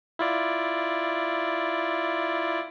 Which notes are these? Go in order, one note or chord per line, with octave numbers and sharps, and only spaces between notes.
E4 F4 D5